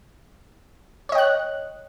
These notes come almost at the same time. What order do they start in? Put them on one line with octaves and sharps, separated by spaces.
C#5 D#5 G5 F#6